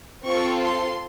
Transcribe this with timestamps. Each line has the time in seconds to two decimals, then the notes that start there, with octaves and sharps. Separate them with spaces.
0.24 C4 F4 A4 C#6
0.62 C6